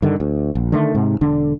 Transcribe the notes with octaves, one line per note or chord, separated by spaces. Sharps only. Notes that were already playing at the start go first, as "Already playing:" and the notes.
G2 D3 D#3
D2
A#1
D3 D#3 A3
G#2 C3
E1 D3 D4